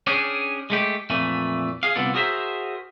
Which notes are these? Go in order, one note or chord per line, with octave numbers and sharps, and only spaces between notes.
C#4 D4 G4 G#4
G#3 A3 G4
F2 A#2 E3 A3
G#4 F5
C2 D3 B3 F4 A4 D5
F#4 G#4 A#4 C5 E5